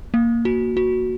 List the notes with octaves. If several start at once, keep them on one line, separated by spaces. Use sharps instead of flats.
A#3
F#4
F#4